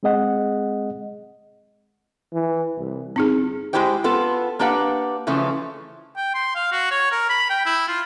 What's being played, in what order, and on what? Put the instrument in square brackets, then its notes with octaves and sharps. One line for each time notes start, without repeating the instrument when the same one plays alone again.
[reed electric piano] G#3 C4 G#4 D#5 F#5
[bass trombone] E3
C2
[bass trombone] G1 [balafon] C4 D#4 G#4
[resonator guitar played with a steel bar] G#3 C#4 E4 G4 C5 G5
B3 F4 A4
A#3 D4 G4 B4 F5 F#5
C#3 E3 F3 A3 C#4
[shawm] G5
C6
F5
F#4
C#5
A#4
B5
G5
E4
F4